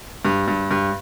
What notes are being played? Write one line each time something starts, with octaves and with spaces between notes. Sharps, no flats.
G2
G2
G2